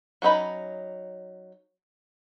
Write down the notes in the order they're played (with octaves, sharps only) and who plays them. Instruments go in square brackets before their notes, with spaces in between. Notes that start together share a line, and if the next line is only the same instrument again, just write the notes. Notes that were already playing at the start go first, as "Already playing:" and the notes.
[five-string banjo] F#3 C#4 D#4 B5